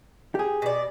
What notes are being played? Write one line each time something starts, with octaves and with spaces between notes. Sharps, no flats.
G4 G#4
B2 D5